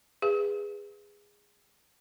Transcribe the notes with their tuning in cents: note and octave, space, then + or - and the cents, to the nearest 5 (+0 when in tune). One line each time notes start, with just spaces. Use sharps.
G#4 -20 B4 +0